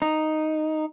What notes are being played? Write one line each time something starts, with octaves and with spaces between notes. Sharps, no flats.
D#4